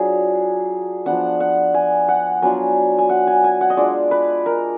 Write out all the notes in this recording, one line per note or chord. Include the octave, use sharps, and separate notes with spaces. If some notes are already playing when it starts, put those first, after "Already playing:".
Already playing: F#3 D4 F4 G#4
F3 B3 D4 F#5
F#5
G#5
F#5
F#3 B3 D4 F4 G#5
G#5
F#5
G#5
G#5
F#5
D#5
G#3 D4 F4 D5
B4
A#4